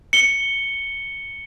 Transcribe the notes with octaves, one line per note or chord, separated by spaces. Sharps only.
C#7 G7